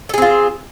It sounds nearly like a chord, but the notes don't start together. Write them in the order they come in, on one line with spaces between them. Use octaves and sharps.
A4 G#4 C4 F4